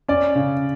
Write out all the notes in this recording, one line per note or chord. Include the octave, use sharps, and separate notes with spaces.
C#4 D5
C#3